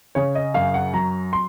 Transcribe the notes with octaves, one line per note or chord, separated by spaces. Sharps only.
C#3 C#5
D#5
F#2 F5
F#5
F#3 A#5
C6